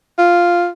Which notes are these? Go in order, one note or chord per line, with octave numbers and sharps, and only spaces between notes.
F4